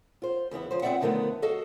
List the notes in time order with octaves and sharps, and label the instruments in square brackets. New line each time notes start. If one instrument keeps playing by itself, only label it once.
[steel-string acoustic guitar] F4 C5
E2 C#3 B3 E4
C#3 F3 C5
B3 C4 F4 D5 E5 F#5
A2 D3 D#3 F3 A3 B3
F#4 A4 D#5 F5